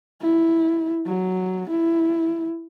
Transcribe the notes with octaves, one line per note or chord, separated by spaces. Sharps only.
E4
F#3
E4